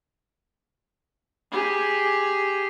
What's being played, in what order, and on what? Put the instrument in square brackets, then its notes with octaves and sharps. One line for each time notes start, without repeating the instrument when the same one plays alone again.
[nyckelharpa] G4 G#4